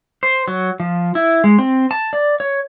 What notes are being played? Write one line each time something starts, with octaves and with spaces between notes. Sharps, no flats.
C5
F#3
F3
E4
G#3
C4
A5
D5
C#5